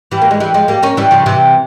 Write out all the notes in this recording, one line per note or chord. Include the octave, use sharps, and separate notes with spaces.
E3 G3
A#3
G#3
E3 G3
F3 G#3
G3 A#3
A#3 C#4
E3 G3
C#3 F3
C3 E3